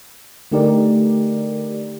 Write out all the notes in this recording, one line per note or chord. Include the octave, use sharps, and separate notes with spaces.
D3 A3 D#4 G4 A#4 D5